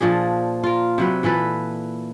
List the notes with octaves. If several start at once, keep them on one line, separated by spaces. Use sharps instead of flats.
A#2 F3 D4 G#4
F4 A#4
C3 F#3 B4
A#2 E3 A4 B4